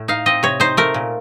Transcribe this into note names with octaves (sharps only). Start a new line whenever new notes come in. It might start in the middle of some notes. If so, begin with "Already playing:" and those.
Already playing: A2 A3
D#4 F5
C4 D#5
C3 C#5
D#4 C5
A3 A#4
A#2